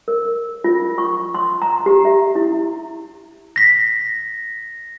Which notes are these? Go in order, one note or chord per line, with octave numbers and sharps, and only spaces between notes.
A#4
F4
C#6
C6
A#5
G4
E5
E4
A#6 B6